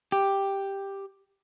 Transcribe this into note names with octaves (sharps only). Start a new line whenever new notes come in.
G4